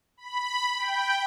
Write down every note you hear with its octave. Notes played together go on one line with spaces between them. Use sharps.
B5
G5